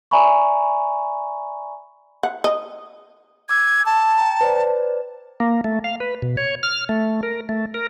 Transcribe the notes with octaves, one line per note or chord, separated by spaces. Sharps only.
D5 E5 G#5 A#5 B5 C#6
F#5
D#5
D6 E6 G#6
A5
G5 A#5
B4 C5 D5
A#3
A3
F5
B4
B2
C#5
F6
A3
A#4
A3
A#4